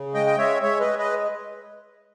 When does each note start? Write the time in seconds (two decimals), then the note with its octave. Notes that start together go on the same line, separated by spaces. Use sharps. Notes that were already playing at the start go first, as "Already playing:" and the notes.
Already playing: C#3
0.14 G#3 D#5 G5
0.27 G5
0.38 G#3 C#5 E5
0.62 G#3 C#5 E5
0.80 B4 D#5
0.87 G#3
0.99 B4 D#5